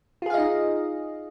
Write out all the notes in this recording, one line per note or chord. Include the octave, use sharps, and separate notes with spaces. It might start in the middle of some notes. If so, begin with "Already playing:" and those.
D#4 F4 G#4 D#5 F5